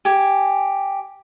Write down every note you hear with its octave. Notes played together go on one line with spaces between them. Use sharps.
G4 G#5